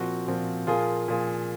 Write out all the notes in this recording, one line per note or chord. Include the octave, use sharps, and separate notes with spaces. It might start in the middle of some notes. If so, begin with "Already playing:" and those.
Already playing: A#2 F3 C4 F#4
A#2 F3 C4 F#4
A#2 F3 A#3 F4 G#4
A#2 F3 A#3 F4 G#4